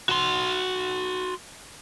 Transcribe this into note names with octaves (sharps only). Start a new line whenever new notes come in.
F#4 C6